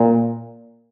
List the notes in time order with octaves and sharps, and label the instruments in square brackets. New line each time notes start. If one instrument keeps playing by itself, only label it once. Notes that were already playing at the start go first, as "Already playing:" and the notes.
Already playing: [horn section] A#2